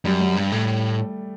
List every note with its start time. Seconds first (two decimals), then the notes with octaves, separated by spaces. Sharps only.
0.05 F#2 G3
0.21 G3
0.36 G2 G3
0.52 A2 A3